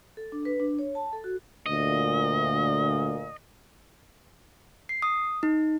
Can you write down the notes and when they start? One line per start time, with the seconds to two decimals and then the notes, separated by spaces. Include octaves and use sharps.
0.17 A4
0.32 D4
0.45 B4
0.60 D4
0.79 C#5
0.95 A5
1.13 A4
1.24 F#4
1.66 D2 A#2 D#5
4.89 C7
5.02 D#6
5.43 D#4